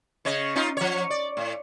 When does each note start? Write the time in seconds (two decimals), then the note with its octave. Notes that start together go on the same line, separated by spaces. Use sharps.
0.25 C#3 C#5 D#5
0.55 C#4 D#4 F4
0.77 F3 C#5
1.10 D5
1.37 A2